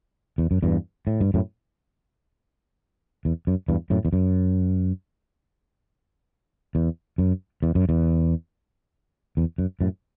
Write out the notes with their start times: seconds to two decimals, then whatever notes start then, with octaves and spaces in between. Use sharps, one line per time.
0.38 E2
0.51 F#2
0.63 E2 G2
1.07 A2
1.21 G2
1.34 F#2 A2
3.25 E2
3.47 F#2
3.68 E2 G2
3.90 F#2 A2
4.05 E2
4.13 F#2
6.75 E2
7.18 F#2
7.63 E2
7.75 F#2
7.89 E2
9.37 E2
9.58 F#2
9.81 F#2 A2